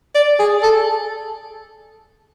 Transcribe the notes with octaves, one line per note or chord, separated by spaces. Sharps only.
D5
G#4
A4